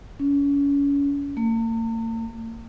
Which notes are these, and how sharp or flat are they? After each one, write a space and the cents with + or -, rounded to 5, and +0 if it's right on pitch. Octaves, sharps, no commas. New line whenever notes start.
C#4 +30
A#3 -45